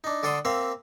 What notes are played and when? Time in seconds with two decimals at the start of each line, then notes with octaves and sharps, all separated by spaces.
0.04 D4 D#4
0.23 D3 A4 D5 F#5 C6 D#6
0.45 A#3 C4 E5 F5